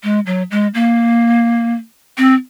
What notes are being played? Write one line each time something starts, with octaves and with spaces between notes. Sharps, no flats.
G#3
F#3
G#3
A#3
C4